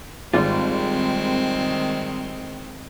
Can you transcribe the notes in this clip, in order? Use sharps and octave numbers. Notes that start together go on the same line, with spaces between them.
G#1 D#3 G3 G#3 C4 F4